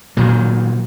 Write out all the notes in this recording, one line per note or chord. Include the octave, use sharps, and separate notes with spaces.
A#2 D#3 F#3